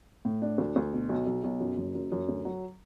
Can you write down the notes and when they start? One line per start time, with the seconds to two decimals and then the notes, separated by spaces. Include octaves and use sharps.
0.25 A2
0.42 D4
0.58 D2
0.76 D2
0.93 B2
1.09 B1
1.27 B1
1.44 B1
1.60 F#2
1.77 F#1
1.95 F#2
2.12 F#2
2.29 D2
2.45 F#3